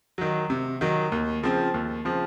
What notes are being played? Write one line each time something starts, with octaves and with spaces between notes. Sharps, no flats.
D#3 F#3
C3
D#3 F#3
D#2
C#3 F3 C4
D#2
C#3 F3 C4